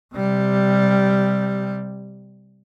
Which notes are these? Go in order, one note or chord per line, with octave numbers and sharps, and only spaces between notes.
C3 G3